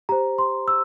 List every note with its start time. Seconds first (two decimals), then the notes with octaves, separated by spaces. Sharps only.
0.09 G4 C5 A#5
0.38 C6
0.68 E6